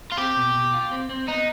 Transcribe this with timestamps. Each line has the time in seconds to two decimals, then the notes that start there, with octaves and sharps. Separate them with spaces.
0.12 F4
0.18 C4 G4
0.36 B2
0.54 B2
0.73 F4
0.91 C4
1.09 C4
1.28 B3 D#4